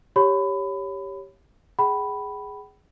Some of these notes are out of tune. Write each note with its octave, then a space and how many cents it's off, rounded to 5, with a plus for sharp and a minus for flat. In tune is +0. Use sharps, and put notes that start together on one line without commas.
G4 +0 C#5 +0 B5 +20
G#4 +0 G5 -45 B5 +0